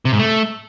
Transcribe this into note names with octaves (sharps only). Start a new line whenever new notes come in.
C3
G#2
A3